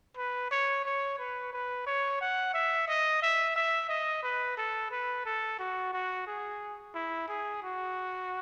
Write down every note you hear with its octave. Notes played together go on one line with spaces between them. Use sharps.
B4
C#5
C#5
B4
B4
C#5
F#5
E5
D#5
E5
E5
D#5
B4
A4
B4
A4
F#4
F#4
G#4
E4
G#4
F#4